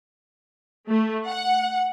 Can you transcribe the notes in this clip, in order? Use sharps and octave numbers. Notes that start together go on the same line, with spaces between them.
A3
F#5